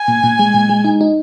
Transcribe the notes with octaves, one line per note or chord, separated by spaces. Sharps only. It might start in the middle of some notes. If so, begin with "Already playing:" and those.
Already playing: G#5
A#2
A#2
G#3
A#2
G#3
D#4
D#4